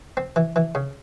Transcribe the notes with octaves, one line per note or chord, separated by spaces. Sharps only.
C4
E3
E3
C#3